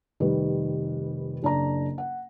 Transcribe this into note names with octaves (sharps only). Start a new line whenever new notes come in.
F1 D#3 G3 B4
F#1 D4 D5 A#5
F#5